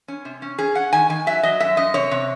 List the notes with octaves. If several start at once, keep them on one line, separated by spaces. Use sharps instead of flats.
C#4
C3
C#4
C#4 G#4
C#4 F#5
D#3 G#5
D#3 G#5
F#3 E5
F#3 D#5
F#2 E5
F#2 D#5
C3 C#5
C3